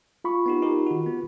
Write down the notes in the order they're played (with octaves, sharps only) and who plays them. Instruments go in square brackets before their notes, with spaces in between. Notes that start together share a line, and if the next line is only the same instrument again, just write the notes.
[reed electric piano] F4 B5 C#6
[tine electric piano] B3 D#4 G4
D#4 G4 A#4
D#3 F#4
B3